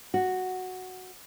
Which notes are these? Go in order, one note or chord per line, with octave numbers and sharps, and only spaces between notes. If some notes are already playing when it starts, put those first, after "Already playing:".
F#4